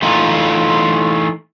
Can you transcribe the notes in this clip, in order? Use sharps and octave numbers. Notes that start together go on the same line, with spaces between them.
E3 A3 D#4 F4